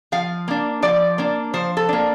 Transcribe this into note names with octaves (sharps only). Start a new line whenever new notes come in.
F3 F5
A#3 D4
F3 D5
A#3 D4
F3 C5
A4
A#3 D4